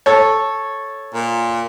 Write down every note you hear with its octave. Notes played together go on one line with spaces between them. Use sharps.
A4 C#5
A#2